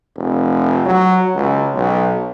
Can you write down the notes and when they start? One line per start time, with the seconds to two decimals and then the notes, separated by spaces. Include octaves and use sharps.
0.16 F1
0.86 F#3
1.35 C#2
1.74 B1